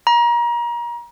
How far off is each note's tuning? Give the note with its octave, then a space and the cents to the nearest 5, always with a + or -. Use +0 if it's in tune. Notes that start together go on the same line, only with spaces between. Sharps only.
A#5 +30